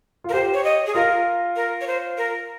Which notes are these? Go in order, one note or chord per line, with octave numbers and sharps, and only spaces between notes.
F4
A#4
G4 C5
C#5
D#5
G#4
F4 A#4
A#4
C#5
C5
A#4